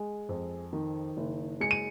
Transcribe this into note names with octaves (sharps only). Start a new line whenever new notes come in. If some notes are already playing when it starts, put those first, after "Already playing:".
Already playing: G#3
F2
D#3
F#1
G#3 C#7
D#7